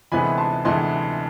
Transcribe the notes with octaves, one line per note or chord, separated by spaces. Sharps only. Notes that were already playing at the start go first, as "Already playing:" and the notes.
D2 C3 E3 G#3 B3 G#5 B5
A5 C6
D2 C3 E3 G#3 B3 A5 C6